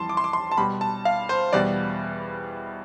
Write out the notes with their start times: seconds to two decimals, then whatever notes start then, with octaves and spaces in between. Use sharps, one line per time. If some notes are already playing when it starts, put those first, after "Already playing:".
Already playing: F2 E3 G3 A5 C6
0.09 D6
0.17 C6
0.24 D6
0.33 C6
0.51 A5
0.57 B2 G3 B5
0.81 A5
1.05 F5
1.29 C5
1.53 E2 B2 G3 D5